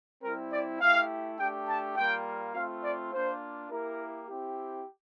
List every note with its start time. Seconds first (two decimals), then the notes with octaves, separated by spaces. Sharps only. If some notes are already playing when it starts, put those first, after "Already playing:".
0.22 G3 C4 E4 A#4
0.51 D5
0.80 A3 E4 G4 F5
1.38 A3 D4 G4 G5
1.68 A5
1.95 G3 A#3 F4 G5
2.54 A3 C4 F4 F5
2.83 D5
3.12 A#3 D4 F4 C5
3.70 A#3 E4 G4 A#4
4.27 C4 E4 G4